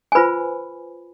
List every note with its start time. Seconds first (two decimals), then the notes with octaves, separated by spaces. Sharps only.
0.12 G#5
0.15 F4 B4 C5 B5